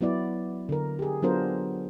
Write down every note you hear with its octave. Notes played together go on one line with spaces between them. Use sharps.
F#3 B3 E4 D5
D3 A#4
G4 G#4
F#3 B3 D4 F4 A#4 C5